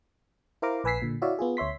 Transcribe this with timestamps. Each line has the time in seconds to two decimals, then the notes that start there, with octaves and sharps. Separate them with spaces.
0.62 E4 A#4 C5 F5 A#5 D6
0.84 A#1 B4 G#5 E6 B6 C7
1.02 A#2 D3
1.22 E4 F#4 C#5 D5 E5 F5
1.39 B3 F4 G#4
1.57 D2 C#5 E5 C6 B6